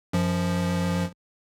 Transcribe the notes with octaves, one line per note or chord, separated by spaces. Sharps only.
F#2 F3